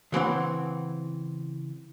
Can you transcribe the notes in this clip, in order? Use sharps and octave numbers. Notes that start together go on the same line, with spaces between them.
C#3 E3 C4 F#5